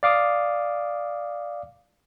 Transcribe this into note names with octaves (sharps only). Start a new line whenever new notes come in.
D5 F5 D6 D#6